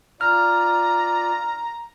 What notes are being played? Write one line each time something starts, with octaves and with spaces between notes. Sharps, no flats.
F4 D5 A#5 F6